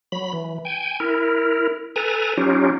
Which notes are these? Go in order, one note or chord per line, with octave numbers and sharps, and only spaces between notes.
F#3 B5
E3
G5 G#5
E4 A#4
A4 B4 G#5 A#5
F#3 C#4 D#4 F4 G4